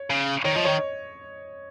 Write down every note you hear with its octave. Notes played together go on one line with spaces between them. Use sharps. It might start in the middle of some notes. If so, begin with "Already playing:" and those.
Already playing: C#5
C#3
D#3 C#5
F3 D#5
D#3 C#5